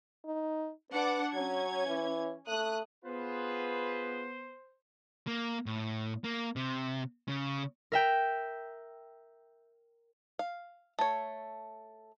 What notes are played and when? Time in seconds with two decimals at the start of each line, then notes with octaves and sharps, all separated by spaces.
0.25 D#4
0.92 D4 B4 F#5 D6
1.34 F#3 C#4 G#6
1.87 E3
2.47 A3 D#6 F#6
3.05 B3 F4 G#4 B4 C5
5.27 A#3
5.66 A2
6.24 A#3
6.56 C3
7.28 C#3
7.92 A#4 E5 G5
10.39 F5
10.99 A3 C#5